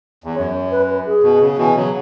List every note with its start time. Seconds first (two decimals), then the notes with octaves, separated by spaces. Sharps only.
0.24 E2
0.36 F#2 C#5
0.71 B4
1.06 G#4
1.23 B2
1.41 C#3
1.58 B2 E3
1.75 C#3 F#3